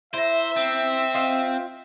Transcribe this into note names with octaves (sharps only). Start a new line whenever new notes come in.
E4 C5 E5 A#5
C4
F4 D#5 F5